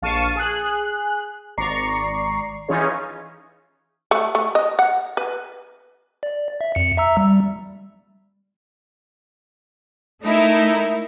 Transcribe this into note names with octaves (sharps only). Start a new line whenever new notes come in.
A#1 F5 A5 C#6 D#7
G#4 F#6
G#1 D5 A#5 C#6 C7
E3 C#4 D#4 F4 G#4 C#5
A3
A3
D#5
F#5
B4
D5
E5
F2 C#7
E5 A#5 E6
G3
A3 D#4 E4 A#4